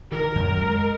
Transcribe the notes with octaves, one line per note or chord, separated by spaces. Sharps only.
D#3 A#4
F#2
G#3